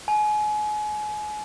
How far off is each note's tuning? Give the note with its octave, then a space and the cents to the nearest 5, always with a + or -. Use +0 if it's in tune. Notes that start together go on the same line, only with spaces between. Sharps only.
G#5 +30